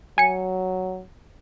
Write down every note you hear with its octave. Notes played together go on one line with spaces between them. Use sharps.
F#3 G#5 C#7